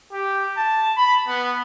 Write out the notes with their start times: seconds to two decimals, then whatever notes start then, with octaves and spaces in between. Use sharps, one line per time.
0.12 G4
0.57 A5
0.97 B5
1.28 B3